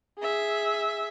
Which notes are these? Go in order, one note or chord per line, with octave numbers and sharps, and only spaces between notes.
G#4 E5